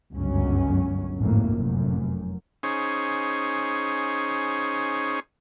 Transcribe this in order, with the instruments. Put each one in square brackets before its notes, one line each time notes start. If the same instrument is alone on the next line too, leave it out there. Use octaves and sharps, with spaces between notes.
[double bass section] G1 C#2 F#2 F#3 C#4
G#1 F2 A2 A#3
F1 F#2
[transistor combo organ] C#4 D#4 G#4 C5